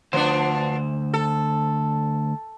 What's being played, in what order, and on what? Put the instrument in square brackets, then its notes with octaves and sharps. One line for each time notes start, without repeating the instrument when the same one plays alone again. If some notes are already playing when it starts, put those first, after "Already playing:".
[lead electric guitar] D2 C5 [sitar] F3 B3 D4
[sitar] A4